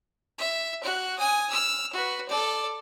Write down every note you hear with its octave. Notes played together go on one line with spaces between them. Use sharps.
E5
F#4 F#6
G#5 D#6
E6 F6
F#4 B4
A4 D5